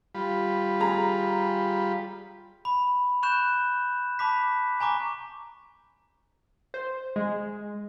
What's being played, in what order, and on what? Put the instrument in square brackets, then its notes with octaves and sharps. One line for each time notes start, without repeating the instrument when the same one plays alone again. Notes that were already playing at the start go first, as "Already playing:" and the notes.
[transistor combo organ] G3 F4 B5
[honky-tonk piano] G#4 A#5
[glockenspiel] B5
B5 C#6 F#6 G6 E7
A5 B5 D6 B6
G#5 A#5 C#6 D6
[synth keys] C5
G#3